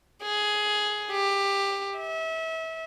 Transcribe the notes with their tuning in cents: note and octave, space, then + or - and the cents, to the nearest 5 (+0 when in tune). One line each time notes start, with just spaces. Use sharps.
G#4 +10
G4 +15
E5 -30